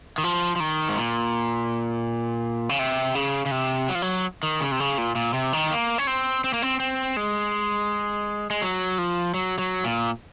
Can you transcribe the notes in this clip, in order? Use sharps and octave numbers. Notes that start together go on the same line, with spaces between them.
D#3
F3
F3
D#3
G#2
A#2
C#3
C3
C#3
C#3
C3
F#3
F3
F#3
D#3
C#3
C3
C#3
A#2
A#2
C3
D#3
A#3
C#4
C4
C4
A#3
C4
C4
G#3
G#3
F#3
F3
F#3
F#3
A#2